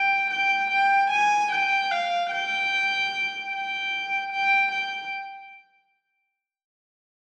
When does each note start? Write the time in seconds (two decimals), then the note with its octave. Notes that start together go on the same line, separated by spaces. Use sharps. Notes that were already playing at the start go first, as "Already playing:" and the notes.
Already playing: G5
0.30 G5
0.70 G5
1.10 G#5
1.51 G5
1.91 F5
2.31 G5
3.51 G5
4.32 G5
4.72 G5